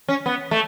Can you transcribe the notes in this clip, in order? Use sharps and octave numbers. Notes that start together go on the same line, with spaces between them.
C#4
B3
A3